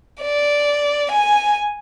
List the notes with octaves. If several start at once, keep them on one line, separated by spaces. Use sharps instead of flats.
D5
G#5